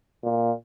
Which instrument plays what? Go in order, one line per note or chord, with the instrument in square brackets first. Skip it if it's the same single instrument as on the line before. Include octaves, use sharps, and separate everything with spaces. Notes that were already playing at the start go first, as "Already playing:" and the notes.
[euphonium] A#2